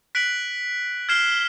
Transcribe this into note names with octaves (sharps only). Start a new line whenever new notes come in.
F#6 B6 D7 F#7
F6 G#6 C7 E7 G7